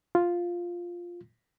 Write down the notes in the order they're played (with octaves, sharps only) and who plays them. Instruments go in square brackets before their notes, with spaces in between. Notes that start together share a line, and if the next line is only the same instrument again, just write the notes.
[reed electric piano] F4